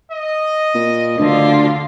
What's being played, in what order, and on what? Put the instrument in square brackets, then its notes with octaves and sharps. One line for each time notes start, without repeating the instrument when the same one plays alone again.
[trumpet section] D#5
[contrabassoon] A#2
[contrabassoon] D2 [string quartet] D3 F4